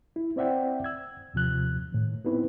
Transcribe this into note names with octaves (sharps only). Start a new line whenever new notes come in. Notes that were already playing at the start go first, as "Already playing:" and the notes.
E4
C4 C5 D5 E5 F#5 G5
E6 G#6
D#2 C3 F3 F#6
A2 D#3
B3 C4 D#4 E4 B4